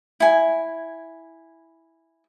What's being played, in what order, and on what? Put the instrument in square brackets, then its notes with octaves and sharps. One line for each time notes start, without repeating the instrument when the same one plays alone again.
[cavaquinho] E4 G#5